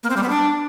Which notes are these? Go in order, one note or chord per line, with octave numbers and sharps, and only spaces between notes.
A#3
C4
G3
B3
D4